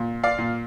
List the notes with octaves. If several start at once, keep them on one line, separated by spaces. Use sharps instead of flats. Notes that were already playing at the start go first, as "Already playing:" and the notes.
Already playing: A#2
D5 F5
A#2